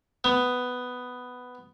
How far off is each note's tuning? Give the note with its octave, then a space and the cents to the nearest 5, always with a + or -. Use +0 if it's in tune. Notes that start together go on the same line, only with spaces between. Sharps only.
B3 +10